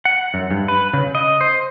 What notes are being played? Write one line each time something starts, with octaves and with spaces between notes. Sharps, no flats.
F#5
F#2
G2
B4
C#3
D#5
C5